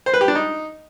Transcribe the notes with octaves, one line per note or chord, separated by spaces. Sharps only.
C5
B4
G4
D4
D#4